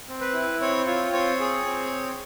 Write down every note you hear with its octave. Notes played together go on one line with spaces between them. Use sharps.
C4
B4
E4
C4 C#5
F4 C#5
C4 C#5
G#4
C4